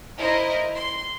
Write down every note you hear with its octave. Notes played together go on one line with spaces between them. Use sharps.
E4 A#4 C5 D#5
C6